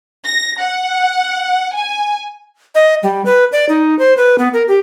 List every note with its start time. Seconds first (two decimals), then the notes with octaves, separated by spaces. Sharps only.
0.26 A#6
0.61 F#5
1.75 G#5
2.75 D#5
3.03 G3
3.25 B4
3.52 D5
3.69 D#4
3.99 C5
4.17 B4
4.38 B3
4.53 A#4
4.68 G4